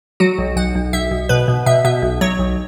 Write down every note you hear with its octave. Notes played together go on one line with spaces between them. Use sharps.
F#3 F#4
B1
B1 F#5
B1
B1 E5
B1
B2 B4
B2
B2 E5
B2 E5
B1
F#3 C#5
B1